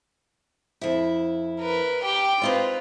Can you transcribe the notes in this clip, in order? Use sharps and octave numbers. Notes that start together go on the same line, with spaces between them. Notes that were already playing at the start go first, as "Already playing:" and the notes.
F2 E4
A#4 B4
G4 G5
C4 D#4 F4 B4 D5